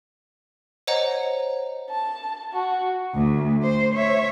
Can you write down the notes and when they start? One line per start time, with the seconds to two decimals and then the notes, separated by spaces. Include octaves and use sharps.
0.87 C5 C#5 D#5 F#5 A#5
1.90 A5
2.52 F#4
3.15 D2
3.63 C5
3.94 C#5 E5